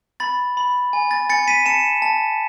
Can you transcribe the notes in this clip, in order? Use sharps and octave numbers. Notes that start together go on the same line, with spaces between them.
B5 A6
B5
G#5
A6
G#5 A6 C#7
B6 D#7
A5 C#7 E7
A5